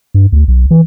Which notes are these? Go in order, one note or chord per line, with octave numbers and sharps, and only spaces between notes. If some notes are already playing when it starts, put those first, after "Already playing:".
G2
D2
B1
E3